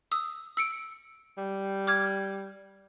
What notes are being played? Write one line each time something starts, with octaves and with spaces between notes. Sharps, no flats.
D#6 E6
E6 C#7 D7
G3
D6 F6 G#6